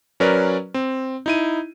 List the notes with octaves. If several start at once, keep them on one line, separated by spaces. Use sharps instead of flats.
F#3 C#4 A#4 B4 D5
C4
D#4 E4 D#7